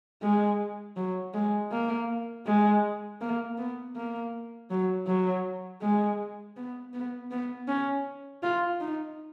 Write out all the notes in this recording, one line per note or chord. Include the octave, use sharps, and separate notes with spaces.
G#3
F#3
G#3
A#3
G#3
A#3
B3
A#3
F#3
F#3
G#3
B3
B3
B3
C#4
F4
D#4